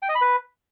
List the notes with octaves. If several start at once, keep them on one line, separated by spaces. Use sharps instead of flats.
G5
D#5
B5
B4